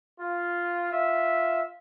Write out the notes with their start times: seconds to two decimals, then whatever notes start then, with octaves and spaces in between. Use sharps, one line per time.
0.20 F4
0.93 F4 E5